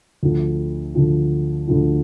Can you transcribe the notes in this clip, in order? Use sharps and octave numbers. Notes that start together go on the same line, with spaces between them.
D2 D3 F3
D2 D3 F3
D2 D3 F3